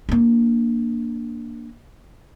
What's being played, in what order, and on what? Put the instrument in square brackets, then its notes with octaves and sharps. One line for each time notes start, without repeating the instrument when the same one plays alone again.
[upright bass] A#3 D4